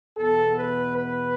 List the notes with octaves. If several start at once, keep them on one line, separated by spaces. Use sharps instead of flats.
E2 B2 B3 A4
B4
B4